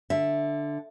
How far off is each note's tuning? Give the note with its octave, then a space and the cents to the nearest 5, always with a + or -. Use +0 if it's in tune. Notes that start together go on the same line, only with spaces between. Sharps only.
D3 +0 E5 +0